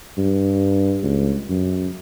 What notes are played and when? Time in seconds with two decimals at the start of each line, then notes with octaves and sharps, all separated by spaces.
0.18 G2
1.03 C#2
1.49 F#2